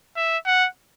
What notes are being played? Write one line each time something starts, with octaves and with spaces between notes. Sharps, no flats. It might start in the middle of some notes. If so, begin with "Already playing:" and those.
E5
F#5